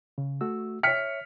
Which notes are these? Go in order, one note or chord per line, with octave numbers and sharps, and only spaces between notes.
C#3
A3 F#4 E6
C#5 E5 F6 B6 C#7